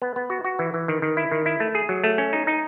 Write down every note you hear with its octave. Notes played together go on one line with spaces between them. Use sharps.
B3
B3
F#4
F#4
E3
E3
D#3
D#3
E4
D#3
E4
A3
G#4
F#3
A3
C#4
D#4
D#4